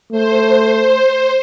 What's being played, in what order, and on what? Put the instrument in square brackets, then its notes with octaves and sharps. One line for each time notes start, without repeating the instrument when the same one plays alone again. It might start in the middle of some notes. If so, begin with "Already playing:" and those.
[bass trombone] A3 [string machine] C5